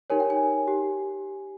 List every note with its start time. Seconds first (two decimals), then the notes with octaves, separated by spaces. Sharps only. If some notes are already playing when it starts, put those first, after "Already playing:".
0.10 D#4 G4 A#4 C#5 G#5
0.20 G5
0.30 G#5
0.68 G4